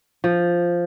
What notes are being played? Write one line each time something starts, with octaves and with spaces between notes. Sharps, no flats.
F3